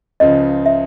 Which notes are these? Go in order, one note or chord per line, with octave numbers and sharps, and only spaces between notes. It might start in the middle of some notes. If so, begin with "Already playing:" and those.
C#2 C#3 F3 D#5
E5